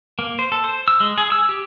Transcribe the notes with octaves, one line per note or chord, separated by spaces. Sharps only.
A#3
C5
A4
C5
E6
G#3
G#4
E6
G4